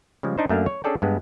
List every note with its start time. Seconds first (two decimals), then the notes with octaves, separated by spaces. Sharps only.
0.23 C#3 F3 G3 G#3
0.38 D4 D#4 C5
0.49 F#2 A3 A#3 D4 F5
0.66 C#5
0.84 C#4 D4 G#4 A4 D5 G5
1.02 G2 G#3 B3